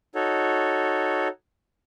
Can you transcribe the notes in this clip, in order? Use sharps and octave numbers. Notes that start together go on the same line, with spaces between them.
D#4 F#4 A4 C#5